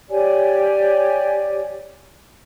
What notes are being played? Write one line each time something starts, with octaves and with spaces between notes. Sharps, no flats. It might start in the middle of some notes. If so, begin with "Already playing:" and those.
G4 C#5 D5 G#5